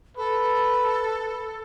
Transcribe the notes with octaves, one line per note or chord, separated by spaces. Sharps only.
A4 B4